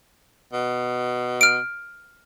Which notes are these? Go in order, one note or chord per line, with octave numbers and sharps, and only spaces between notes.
B2
F6 D7